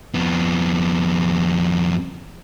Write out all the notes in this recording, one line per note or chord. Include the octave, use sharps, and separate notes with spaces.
F2 B3